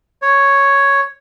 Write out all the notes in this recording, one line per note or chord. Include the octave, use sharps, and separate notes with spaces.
C#5